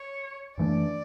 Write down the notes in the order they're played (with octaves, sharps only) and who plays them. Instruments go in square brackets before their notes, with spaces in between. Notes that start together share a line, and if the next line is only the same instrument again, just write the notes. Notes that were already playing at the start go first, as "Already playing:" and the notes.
Already playing: [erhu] C#5
[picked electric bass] F#2 E3 A3 D4 [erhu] D5